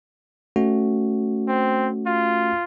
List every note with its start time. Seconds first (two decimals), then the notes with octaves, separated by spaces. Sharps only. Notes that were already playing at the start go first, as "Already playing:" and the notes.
0.56 A3 C#4 F#4
1.48 C4
2.07 F4